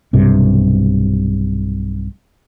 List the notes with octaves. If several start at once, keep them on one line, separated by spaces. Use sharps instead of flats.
B1 G2 C3